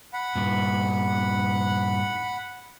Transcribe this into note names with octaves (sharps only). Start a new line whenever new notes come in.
F#5 B5
G2 A#2